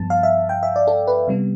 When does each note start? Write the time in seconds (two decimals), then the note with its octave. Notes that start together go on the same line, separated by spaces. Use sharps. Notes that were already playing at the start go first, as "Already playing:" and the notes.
Already playing: G2 F3 B3 A5
0.10 F5
0.23 E5
0.49 G5
0.63 E5
0.76 D5
0.87 A4
1.07 B4
1.28 C3 G3 B3